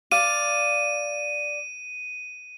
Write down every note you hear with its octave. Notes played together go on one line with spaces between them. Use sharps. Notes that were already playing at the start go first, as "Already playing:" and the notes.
D5 F5 D#7